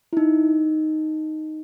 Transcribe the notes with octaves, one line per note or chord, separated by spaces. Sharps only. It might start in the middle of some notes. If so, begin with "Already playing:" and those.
E4
D#4